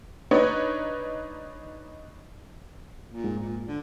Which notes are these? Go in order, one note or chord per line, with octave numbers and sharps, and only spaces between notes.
D4 D#4 B4 C#5
A#2
G#2
A#2
D3